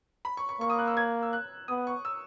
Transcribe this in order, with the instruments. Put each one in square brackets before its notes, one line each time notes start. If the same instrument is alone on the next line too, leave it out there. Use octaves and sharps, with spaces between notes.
[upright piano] B5
C#6
C#6
[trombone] A#3 [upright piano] C#6
[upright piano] D#6
F#6
E6
G#6
E6
F#6
[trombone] B3 [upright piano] D#6
[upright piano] C#6
E6